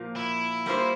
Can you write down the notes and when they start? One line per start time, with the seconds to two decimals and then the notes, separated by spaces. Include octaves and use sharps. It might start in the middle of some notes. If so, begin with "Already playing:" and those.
Already playing: A#2 F3 A#3
0.16 E4
0.66 G3 A#3 F4 C5